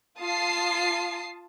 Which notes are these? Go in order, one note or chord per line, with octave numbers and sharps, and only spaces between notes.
F4 A5 D#6 C7